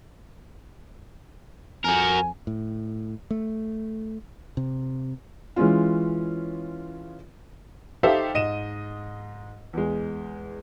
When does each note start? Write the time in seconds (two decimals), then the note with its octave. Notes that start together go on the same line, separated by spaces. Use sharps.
1.85 F2 F#4 A#4 G#5
2.47 A2
3.31 A3
4.57 C3
5.56 E3 G#3 C#4 F4
8.03 D#4 G4 A4 C5 E5 F5
8.34 G#2 D#5 D#7 E7
9.73 E2 G#3